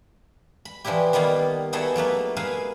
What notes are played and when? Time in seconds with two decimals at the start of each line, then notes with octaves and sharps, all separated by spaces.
0.65 B5
0.85 E3 F3 D4 E4 G4
1.13 D#3 G3 A#3 B3 F5
1.73 B3 D#4 E4 F#4 G#4 A4
1.96 F#3 A3 A#3 B4
2.37 G#4 A#4 B4 E5 F5